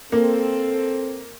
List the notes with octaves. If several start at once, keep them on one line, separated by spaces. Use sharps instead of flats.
A#3 C4 A4